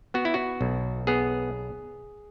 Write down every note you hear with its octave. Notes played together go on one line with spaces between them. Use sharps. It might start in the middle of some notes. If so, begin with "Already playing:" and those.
B3 F#4
E4
F#4
B1
B3 G#4